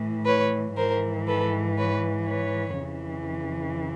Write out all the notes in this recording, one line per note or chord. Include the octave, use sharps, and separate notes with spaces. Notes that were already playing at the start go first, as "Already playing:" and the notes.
Already playing: A2 E3
B4 C#5
G#2 E3 A#4 C5
A4 B4
B4 C#5
B4 C#5
F2 C#3 E3